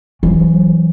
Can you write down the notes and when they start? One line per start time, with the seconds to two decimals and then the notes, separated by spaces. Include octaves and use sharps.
0.23 E3 F#3